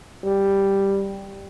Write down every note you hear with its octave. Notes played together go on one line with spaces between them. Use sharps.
G3